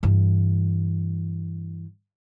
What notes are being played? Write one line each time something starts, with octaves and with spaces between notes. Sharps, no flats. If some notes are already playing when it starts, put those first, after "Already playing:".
G2 E3